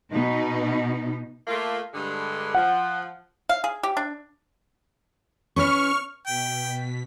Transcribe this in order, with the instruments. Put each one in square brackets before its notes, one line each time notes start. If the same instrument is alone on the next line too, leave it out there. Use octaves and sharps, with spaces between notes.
[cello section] B2 D#4
[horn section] A3 A#3 F4
G2 D3 G#3
[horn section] F3 [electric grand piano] F#5
[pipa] F5
G#4
G4
D4
[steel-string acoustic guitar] C#4 B4 C#5 [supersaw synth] C#6 F6
[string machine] B2 B6 [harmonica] G5